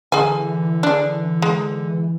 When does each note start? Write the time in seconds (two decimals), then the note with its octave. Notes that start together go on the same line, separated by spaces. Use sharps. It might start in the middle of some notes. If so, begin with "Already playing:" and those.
0.12 D3 E3 G#4 G#5
0.83 D4 G#4
1.42 G#3